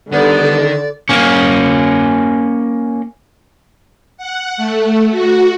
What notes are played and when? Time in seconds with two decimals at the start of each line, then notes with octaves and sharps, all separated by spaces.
0.12 D3 D#3 G3 B3 D5
1.09 A#3 C#4
4.17 F#5
4.57 A3
5.11 F#4